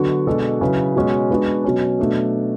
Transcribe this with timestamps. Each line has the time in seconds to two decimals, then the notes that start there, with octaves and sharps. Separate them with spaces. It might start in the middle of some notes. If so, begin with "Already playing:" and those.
Already playing: D3 F#3 B3 D4 F#4
0.27 B2 G#3 D4 F#4 A4
0.61 C#3 F#3 C#4 E4 B4
0.96 B2 G#3 C#4 F#4 C#5
1.30 G#3 B3 D4 F#4
1.64 B2 F#3 C#4
1.99 B2 F#3 A3 D4 A4